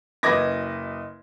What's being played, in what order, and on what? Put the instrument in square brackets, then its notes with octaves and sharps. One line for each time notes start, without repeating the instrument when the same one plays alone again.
[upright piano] F#1 B4 D#5 D6 G#6 A#6